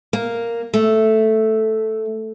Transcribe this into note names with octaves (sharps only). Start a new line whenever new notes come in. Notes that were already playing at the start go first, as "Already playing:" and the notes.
A#3
A3